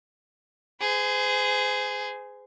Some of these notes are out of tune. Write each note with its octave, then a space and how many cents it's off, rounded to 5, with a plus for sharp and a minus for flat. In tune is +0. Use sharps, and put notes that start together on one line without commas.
G#4 +0 C5 -40